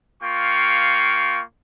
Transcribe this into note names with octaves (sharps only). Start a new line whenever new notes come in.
A#3 F4 G5 C#6